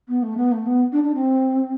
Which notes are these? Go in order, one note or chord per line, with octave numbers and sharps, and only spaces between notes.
B3
A3
B3
A3
B3
D4
D4
C4